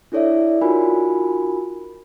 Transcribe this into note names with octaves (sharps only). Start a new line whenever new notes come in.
D4 E4 A4 C#5 D5 E5
D#4 F4 F#4 A#4 G#5 B5